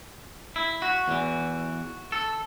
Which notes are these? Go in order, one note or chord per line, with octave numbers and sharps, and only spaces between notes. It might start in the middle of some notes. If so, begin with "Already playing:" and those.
E4
F#4
E2 E3
A4